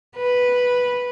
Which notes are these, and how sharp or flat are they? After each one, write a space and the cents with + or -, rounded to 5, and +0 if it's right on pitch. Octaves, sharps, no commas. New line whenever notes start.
B4 -5